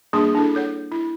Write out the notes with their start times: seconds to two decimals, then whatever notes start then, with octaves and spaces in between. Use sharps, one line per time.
0.13 G3 A#3 D4 G#4 C6
0.35 D4 E4 A4
0.55 A4 C#5 F#5
0.92 E4